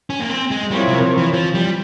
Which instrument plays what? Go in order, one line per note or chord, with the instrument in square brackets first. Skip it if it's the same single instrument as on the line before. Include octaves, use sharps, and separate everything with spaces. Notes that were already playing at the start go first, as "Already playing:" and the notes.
[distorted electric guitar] C#4
A#3
C4
G#3
[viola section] F3 C4 E4 A#4 C#5 [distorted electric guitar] G3
[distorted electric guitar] C3
E3
F3
G3